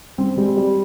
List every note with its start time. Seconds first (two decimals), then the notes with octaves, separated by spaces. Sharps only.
0.18 G3 C4
0.37 G3 G#3
0.57 G3